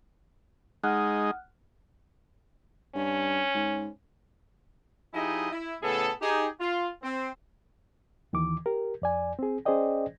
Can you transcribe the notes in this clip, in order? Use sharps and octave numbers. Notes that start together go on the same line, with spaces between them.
G#3 D#4 F#5 F6 F#6
G2 C#4
G#2
F3 D#4 E4 G4 G#4 D#5
E4
A2 C#3 B3 G#4 A4
D#4 G4 G#4
F4
C4
D#2 D#3 E3 D6
G4 A#4
F2 D5 G#5
C4 G#4
C#4 G#4 C5 D5 D#5 G5